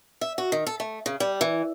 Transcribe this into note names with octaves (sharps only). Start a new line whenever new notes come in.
E5
F#4
D#3
A4
A3
C#3
G3
E3